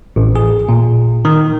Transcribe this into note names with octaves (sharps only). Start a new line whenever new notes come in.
A1
G#4
A#2
D#3